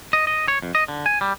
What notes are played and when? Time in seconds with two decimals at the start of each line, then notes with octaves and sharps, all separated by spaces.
0.13 D#5
0.27 D#5
0.48 C#5
0.62 F2
0.75 D#5
0.88 D3
1.06 G#5
1.21 G3